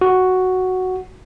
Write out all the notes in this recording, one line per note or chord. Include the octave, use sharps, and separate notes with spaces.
F#4